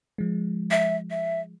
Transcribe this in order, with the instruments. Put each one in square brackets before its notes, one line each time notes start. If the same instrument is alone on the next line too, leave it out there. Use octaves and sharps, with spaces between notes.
[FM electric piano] F3 G#3
[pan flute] E5
E5